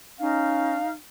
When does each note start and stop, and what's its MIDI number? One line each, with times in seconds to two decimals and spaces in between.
0.20 0.79 61
0.20 0.91 63
0.20 0.94 77